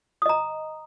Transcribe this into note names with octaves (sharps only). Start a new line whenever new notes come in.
D#5 A#5 D#6